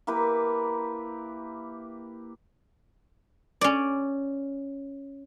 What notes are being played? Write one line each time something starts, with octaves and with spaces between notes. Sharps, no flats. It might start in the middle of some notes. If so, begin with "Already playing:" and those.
A#3 E4 G4 B4
C#4 D5